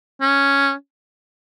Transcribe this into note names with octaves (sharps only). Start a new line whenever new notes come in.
C#4